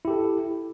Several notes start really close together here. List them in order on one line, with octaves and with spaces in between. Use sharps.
E4 G4 A4